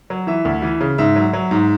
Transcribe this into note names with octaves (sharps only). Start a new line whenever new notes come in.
F#3
E3 E5
D2
E3
C#3
G#2 E5
F#3
F#3
G#2